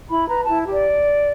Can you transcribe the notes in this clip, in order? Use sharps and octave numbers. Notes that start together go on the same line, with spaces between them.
E4 B5
B4 A#5
E4 A5
G4
D5